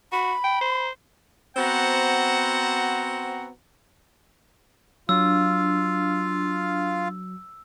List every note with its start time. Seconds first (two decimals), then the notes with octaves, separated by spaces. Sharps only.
0.12 F#4 B5
0.44 G5
0.61 C5
1.57 B3 C4 F#4 C5 F#5 A#5
5.09 F#3 D4 F4 F5 E6